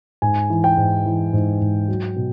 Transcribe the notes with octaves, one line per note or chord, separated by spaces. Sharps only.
G#2 G#5
E3
G5
G#2
E3
G#2
G#2
F#3
B2